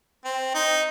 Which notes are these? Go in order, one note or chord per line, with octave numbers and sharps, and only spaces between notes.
C4
D#4